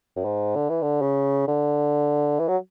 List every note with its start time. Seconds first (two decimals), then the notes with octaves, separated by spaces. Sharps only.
0.17 F#2
0.25 G#2
0.56 D3
0.70 E3
0.82 D3
1.02 C#3
1.48 D3
2.39 E3
2.48 F#3